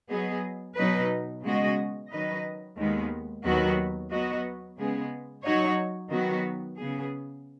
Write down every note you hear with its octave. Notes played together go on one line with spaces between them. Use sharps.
F#3 B3 G#4 D#5
B2 F#3 D#4 B4
C#3 G#3 B3 F#4 D#5
D#3 F#3 D#4 B4 D#5
D#2 D#3 G#3 B3
D#2 D#3 F#3 B3 F#4
F#3 B3 F#4 D#5
C#3 G#3 B3 G#4
F#3 D#4 F#4 C#5
D#3 F#3 B3 F#4
C#3 B3 G#4